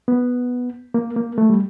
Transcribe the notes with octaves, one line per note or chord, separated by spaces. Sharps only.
B3
A#3
A#3
A3
G3